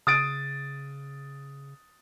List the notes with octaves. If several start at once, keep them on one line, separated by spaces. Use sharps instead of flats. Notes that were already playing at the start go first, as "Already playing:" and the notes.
C#3 D#6 A6 D7